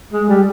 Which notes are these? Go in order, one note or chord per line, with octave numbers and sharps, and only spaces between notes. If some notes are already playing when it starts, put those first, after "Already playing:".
G#3
G3